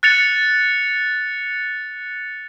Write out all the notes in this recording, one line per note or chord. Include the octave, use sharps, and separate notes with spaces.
F#6 A6 C#7 F7